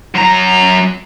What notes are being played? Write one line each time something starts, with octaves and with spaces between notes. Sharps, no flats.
F#2 A#5